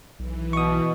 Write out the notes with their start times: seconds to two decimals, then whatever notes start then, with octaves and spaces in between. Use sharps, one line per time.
0.19 B1 E3
0.53 B2 C#6 D#6